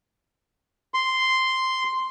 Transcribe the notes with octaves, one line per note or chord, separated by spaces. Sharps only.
C6